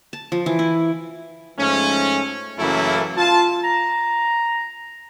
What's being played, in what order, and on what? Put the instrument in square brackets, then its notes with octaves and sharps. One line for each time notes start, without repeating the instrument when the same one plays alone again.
[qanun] A5
F3
E3
E4
[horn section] G#2 F3 A3 C#4
F#2 C#3 E3 A3 A#3 E4
F4 A5
[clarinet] A#5